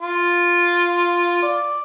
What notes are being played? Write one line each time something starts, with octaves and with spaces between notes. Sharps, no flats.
F4
D5